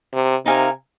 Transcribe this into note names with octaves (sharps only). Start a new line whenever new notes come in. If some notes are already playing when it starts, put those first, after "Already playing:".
C3
C3 D#4 A#4 F5 G#5